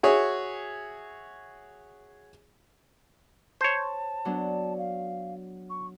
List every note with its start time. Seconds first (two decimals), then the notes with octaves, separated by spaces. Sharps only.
0.03 F#4 G#4 C#5 E5
3.61 C5 C#5 A5
4.25 F#3 B3 D4
4.78 F5
5.70 C#6